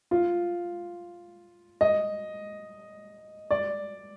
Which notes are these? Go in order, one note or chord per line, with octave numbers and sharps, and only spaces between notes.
F4
D#5
D5